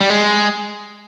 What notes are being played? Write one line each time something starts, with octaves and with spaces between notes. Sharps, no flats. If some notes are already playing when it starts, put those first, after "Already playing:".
G3
G#3